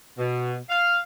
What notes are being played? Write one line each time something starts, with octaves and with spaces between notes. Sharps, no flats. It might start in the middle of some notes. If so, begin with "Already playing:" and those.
B2
F5